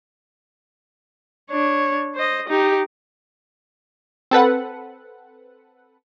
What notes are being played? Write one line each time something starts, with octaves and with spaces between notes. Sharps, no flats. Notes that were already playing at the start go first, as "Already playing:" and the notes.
D4 C#5
C5 D#5
D#4 G4
C4 A4 B4 F#5